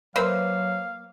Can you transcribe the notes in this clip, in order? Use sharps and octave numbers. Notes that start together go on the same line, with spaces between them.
F#3 A#3 B4 C5 E5 F5